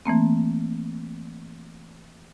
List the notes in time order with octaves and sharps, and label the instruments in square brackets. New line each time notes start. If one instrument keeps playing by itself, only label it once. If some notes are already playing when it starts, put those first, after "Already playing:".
[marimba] E3 A3 A#3 C4